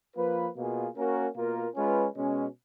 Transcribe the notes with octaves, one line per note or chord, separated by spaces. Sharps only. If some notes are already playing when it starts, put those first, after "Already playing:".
F3 A#3 F4 B4
B2 A#3 F4 G#4
A#3 C#4 F#4 A#4
B2 A#3 F4 A#4
G#3 C#4 F4 B4
B2 G#3 C#4